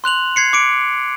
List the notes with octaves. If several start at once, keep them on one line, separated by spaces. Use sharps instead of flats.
C6 F#6 F7 F#7
G#6 C7 C#7
D6 C#7 D7